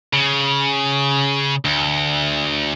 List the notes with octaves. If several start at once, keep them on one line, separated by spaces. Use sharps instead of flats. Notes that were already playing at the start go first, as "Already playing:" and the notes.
C#3
D2